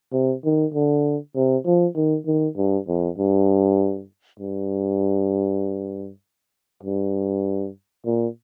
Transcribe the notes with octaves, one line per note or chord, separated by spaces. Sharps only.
C3
D#3
D3
C3
F3
D#3
D#3
G2
F2
G2
G2
G2
A#2